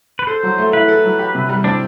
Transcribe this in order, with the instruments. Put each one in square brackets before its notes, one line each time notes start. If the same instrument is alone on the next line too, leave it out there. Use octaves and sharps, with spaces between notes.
[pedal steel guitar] B4
[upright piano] A4 [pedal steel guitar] C5
[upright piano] F#3
A3
[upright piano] E4 [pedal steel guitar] B4
[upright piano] A4
F#3
G4
C3
G3
[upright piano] C4 [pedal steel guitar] D4